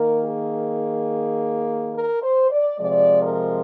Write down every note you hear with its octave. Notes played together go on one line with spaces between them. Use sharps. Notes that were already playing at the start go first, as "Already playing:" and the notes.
Already playing: D#3 A#3 A#4
G#4
A#4
C5
D5
C3 F3 G#3 D5
A#4